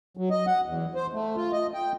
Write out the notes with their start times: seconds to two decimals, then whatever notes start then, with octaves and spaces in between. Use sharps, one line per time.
0.17 F#3
0.30 D#5
0.47 F#5
0.66 E2
0.95 C5
1.13 A3
1.36 F4
1.52 D#5
1.74 G5